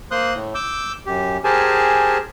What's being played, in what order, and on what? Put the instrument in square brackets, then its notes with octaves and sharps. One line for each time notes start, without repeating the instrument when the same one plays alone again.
[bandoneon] A#3 C5 C6 D#6 F#6
A2
D6 E6 G6
F#2 G4
G4 G#4 A#4 C5 G#5 A5